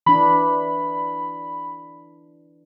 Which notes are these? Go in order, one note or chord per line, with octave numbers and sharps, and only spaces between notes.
E3 D4 B5